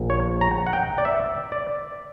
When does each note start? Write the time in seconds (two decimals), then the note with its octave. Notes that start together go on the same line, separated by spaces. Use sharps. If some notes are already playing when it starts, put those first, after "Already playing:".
Already playing: A#1
0.10 C#5
0.41 A#5
0.66 F#5
0.73 G5
0.98 D5
1.05 E5
1.52 D5